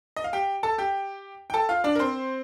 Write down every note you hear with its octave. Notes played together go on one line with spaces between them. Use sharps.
D#5
F5
G4 G5
A4 A5
G4 G5
G5
A4 A5
F4 F5
D4 D5
A#4
C4 C5